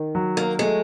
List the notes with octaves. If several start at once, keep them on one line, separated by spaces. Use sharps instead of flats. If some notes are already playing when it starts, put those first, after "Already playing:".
Already playing: D#3
F#3
A#3
G#3 A3